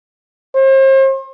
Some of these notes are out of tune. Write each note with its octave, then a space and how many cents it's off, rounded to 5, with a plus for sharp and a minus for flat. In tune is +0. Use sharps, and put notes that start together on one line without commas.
C5 +40